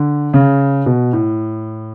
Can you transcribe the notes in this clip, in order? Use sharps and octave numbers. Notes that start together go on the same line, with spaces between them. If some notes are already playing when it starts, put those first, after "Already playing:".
Already playing: D3
C#3
B2
A2